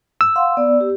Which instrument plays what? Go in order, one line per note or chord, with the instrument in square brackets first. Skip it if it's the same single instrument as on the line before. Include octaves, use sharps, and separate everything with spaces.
[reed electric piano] E6
[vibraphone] F5 F#5 C6
B3 D5
G4